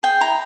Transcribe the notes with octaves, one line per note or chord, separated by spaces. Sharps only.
G#4 G5
E4 A#5